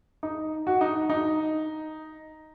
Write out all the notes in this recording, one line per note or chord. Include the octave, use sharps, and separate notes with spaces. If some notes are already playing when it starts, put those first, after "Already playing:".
D#4
F#4
D#4
D#4